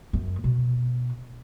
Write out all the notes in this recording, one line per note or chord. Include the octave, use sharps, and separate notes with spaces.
F#2
B2